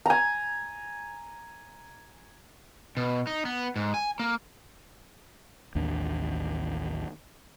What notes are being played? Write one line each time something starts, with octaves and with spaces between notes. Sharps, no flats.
G#5 A#5
B2
D#4
B3
G#2
G#5
A#3
A1 D#2 D#3 D4